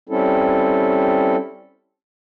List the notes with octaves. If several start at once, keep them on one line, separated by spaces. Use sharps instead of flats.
G3 C4 C#4 E4 A4